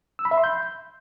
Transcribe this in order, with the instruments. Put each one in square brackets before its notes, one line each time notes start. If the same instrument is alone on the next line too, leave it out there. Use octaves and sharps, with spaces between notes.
[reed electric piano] E6
B5
E5
C6
G6